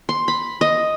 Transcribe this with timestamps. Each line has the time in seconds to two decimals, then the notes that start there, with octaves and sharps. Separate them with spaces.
0.09 C6
0.28 B5
0.61 D#5